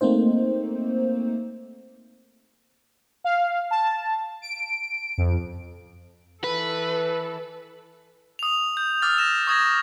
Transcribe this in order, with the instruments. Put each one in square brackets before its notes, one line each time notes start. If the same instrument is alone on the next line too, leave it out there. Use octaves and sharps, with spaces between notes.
[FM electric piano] A3 A#3 C4 D#4 C5
[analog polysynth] F5
A5
D7
F2
[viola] E3 A4 [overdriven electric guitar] B4
[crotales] D#6 F7
G6
D6 E6 F6 A6
A#6 E7
C#6 D#6 G#6 A#6